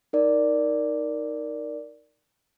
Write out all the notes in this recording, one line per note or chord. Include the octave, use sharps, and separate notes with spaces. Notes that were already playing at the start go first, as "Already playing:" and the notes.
D#4 A#4 D5